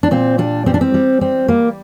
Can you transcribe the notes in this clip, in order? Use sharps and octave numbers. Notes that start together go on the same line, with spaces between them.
D4
A#2 C4
G3 D4
G3 C4
D4
C4
G3
G3 C4
G3 A#3